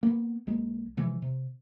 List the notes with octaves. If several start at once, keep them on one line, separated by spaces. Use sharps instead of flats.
A#3 B3
B1 G#3 A#3
C3 E3 F3 G#3
C3